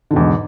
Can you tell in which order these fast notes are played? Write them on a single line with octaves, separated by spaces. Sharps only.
D3 B2 E2 G#2